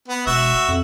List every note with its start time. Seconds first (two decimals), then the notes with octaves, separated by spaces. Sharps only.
0.08 B3
0.26 E1 F#4 E5
0.68 F2